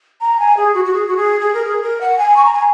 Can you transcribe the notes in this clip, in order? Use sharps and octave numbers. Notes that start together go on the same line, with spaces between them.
A#5
G#5
G#4
F#4
F#4
G#4
F#4
G#4
G#4
A#4
G#4
A#4
F#5
G#5
C#6
A#5
G#5